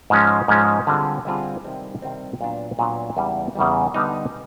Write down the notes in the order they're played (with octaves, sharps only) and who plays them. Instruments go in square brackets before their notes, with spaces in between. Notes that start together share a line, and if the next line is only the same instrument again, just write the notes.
[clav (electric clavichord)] G#2 F3 G#3 C#4
G#2 F3 G#3 C#4
D3 G3 C4 F4 G#4
D3 G3 C4 F4 G#4
C3 D#3 G3 C4
C3 D#3 G3 C4
A#2 F#3 B3 D4
A#2 F#3 B3 D4
E2 C#3 E3 G3
E2 C#3 E3 G3
D3 G3 B3 D#4